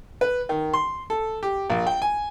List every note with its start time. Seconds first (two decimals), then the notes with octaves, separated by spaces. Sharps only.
0.21 B4
0.49 D#3
0.74 C6
1.10 A4
1.43 G4
1.70 A#1
1.87 G5
2.02 G#5